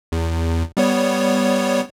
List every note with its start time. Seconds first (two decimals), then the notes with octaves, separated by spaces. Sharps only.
0.12 E2
0.77 G3 B3 C#5